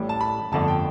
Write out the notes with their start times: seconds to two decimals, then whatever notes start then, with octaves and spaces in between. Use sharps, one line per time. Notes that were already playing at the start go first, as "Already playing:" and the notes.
Already playing: A1 A2 G3
0.09 A5
0.21 B5
0.52 G1 F2 D3 A3 D4 A5
0.68 G5